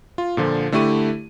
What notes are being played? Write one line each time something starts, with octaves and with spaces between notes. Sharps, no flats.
F4
A#2 D3 F3
D3 A3 E4 G4 C#6 D#7